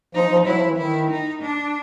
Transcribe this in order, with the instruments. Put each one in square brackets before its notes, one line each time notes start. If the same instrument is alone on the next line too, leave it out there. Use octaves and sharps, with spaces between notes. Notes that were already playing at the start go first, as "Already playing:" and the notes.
[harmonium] F3 [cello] D#4
[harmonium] F3
[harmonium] F#3 [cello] E4
[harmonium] F3
E3
[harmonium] D#3 [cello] E4
[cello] D#4
D4